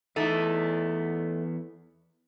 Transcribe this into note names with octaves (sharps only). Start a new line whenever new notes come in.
E2 A3 D#4 E4